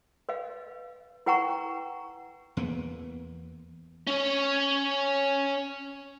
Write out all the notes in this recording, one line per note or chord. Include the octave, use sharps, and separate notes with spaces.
B4 D#5 F5
E4 B4 F#5 G5 A#5 C#6
E2 A#3 B3
C#4 C#5